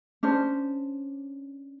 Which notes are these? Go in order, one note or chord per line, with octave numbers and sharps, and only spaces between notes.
C#4 D4 C5